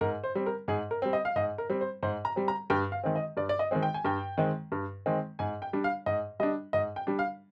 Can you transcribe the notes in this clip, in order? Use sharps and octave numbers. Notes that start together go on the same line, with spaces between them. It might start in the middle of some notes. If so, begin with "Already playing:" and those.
G#2 A#4
C5
G3 C4
A#4
G#2 G#4
A#4
G3 C4
D#5
F5
G#2 D#5
A#4
G3 C4
C5
G#2 C5
A#5
G3 C4
A#5
G2 G5
F5
D#3 G#3 C4
D#5
G2 D5
D5
D#5
D#3 G#3 C4
G5
G#5
G2 G5
D#3 G#3 C4
G2
D#3 G#3 C4
G#2 G#5
G5
G3 D4
F5
G#2 D#5
G3 D4 D#5
G#2 D#5
G5
G3 D4
F5